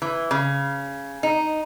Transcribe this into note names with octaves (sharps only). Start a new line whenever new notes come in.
E3
C#3
D#4